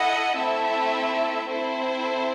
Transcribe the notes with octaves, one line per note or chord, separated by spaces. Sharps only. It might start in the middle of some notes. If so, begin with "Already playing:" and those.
Already playing: E4 A4 D#5 F#5
A3 C4 E4 A4 E5
C4 E4 A4 C5